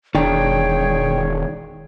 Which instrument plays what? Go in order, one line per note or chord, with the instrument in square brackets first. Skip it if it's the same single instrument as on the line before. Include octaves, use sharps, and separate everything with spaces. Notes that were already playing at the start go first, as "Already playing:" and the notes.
[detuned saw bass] E1 [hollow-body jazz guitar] D#3 D4 [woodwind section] G#4 C#5 [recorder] G5